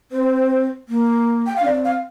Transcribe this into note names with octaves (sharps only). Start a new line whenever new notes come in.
C4 C5
A#3
G5
D4 F5
C4 D5
F5